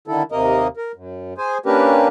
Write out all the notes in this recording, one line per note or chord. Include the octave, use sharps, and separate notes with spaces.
D3 D#3 E4 A4
D#2 C3 A#3 A#4 D#5
A#4
F#2
G#4 C5 G#5
A#3 C#4 D4 G4 A#4 B4